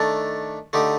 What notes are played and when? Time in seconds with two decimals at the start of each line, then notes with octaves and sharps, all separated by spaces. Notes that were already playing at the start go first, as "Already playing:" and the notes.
Already playing: D#3 A3 D4 A4
0.73 D3 A3 D#4 G4